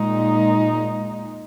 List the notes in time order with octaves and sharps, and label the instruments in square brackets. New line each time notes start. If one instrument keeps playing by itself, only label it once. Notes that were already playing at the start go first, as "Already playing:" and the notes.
Already playing: [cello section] A#2 G#3 D#4